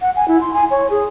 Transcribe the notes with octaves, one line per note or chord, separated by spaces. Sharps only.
F#5
G#5
E4
C6
G#5
C#5
G#4